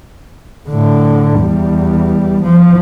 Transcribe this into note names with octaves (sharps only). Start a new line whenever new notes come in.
A2 D3
E2 G3
F3